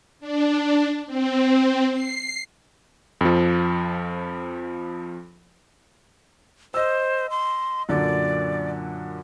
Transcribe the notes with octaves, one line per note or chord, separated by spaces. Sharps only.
D4
C4
C7
F2 F3
C5 D#5 E6
C6
F#2 A#2 D3 D5